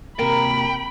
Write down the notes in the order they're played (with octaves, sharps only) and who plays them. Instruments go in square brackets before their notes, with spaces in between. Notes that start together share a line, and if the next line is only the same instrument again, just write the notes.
[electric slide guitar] C3 A#3 [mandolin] A#4 [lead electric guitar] G5 [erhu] B5